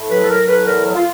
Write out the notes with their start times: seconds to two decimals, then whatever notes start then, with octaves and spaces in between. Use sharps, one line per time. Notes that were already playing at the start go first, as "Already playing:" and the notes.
Already playing: A2
0.09 F#3 B4
0.23 A4
0.28 F#3 A#4
0.47 A2 B4
0.65 E2 A#4
0.85 F#3
0.95 F4